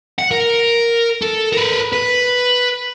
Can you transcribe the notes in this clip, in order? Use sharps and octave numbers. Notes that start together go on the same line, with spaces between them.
F#5
A#4
A4
A#4 B4
B4